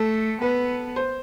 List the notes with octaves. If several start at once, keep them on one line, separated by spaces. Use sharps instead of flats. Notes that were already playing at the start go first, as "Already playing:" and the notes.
Already playing: A3 A4
B3 B4
C5